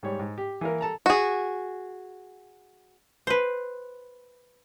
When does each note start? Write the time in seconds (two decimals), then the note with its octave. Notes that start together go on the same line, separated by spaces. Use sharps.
0.03 G#2 G3 C#5
0.19 G#2
0.38 G4
0.61 E3 A#3 A#4
0.81 A4 A5 A#5
1.06 F#4 G#4
3.27 B4 C5